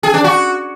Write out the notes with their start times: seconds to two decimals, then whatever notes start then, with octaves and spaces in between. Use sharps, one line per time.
0.03 G#4
0.14 D4
0.24 F#4